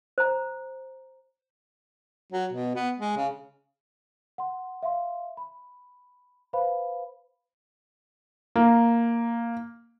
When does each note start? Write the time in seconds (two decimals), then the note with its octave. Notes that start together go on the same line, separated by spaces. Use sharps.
0.18 C5 A#5
2.32 F#3
2.53 B2
2.75 B3
2.98 G#3
3.17 C#3
4.38 F#5 C6
4.83 E5 F5 C6
5.37 B5
6.53 B4 C5 F5 B5
8.56 A#3